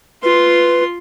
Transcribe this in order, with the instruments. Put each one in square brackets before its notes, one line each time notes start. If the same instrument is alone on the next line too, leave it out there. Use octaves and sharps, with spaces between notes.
[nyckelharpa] F4 C6 [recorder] B4